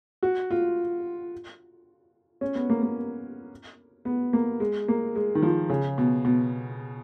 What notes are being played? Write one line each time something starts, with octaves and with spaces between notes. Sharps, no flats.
F#4
F4
C#4
B3
A#3
A#3
B3
A#3
G#3
A#3
G#3
D#3
F3
C#3
B2
B2